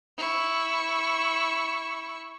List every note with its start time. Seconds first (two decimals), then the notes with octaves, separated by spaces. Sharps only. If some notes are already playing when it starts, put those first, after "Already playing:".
0.18 E4 C#6